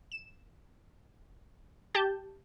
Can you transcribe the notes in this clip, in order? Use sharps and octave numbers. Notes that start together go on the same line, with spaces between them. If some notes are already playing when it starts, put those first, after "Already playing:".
E7
G4 A5 G6